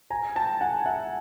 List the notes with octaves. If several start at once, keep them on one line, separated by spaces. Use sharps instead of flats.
G#5 A#5
G5 A5
F#5 G#5
E5 F#5